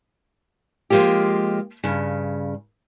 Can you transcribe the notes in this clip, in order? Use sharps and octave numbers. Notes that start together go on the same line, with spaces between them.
F3 G#3 A#3 F4 G4
G2 C#3